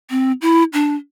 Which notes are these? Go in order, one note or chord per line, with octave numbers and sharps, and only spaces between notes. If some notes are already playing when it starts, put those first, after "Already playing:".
C4
E4
D4